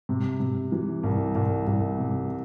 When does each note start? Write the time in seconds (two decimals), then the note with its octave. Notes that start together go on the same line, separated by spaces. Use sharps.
0.09 C3
0.40 C3
0.72 E3
1.03 C2
1.35 C2
1.67 C2
1.98 C3